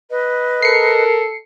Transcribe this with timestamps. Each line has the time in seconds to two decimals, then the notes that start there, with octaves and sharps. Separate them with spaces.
0.10 B4 D#5
0.62 A4 A#4 C7 C#7